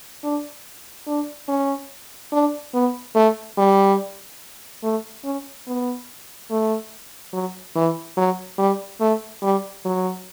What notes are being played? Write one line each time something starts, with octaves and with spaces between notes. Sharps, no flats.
D4
D4
C#4
D4
B3
A3
G3
A3
C#4
B3
A3
F#3
E3
F#3
G3
A3
G3
F#3